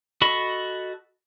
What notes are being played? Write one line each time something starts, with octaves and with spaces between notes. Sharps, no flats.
F#4 A4 D#5 B5 C#6